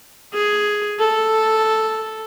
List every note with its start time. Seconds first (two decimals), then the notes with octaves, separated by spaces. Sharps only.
0.34 G#4
0.99 A4